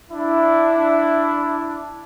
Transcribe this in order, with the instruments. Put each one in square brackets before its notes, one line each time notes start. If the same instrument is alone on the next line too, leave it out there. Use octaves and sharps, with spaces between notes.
[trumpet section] D4 E4